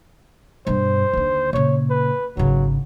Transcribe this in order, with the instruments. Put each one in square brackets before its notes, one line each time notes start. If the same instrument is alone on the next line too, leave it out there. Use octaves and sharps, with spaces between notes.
[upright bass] G2 B2 [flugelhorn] C5
[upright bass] D#2 D3
[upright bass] A#2 C#3 [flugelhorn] C#5
[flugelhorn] B4
[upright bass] G#1 C#3 [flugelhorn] F#3